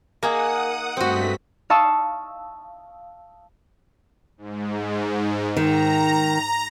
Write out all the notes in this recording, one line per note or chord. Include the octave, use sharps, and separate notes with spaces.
A#3 D#4 G#4 F#5 A#5 D#6
G2 A3 C4 F#4 B6
F5 A5 C#6 D#6 E6
G#2
D#3 A#5